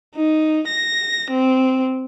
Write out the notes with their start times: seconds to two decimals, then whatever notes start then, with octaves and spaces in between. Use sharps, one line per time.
0.16 D#4
0.68 A#6
1.31 C4